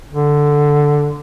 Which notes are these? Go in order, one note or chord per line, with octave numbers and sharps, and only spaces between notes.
D3